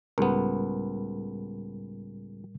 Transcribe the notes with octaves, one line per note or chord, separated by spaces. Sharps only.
C#2 A2 G3 B3 A#4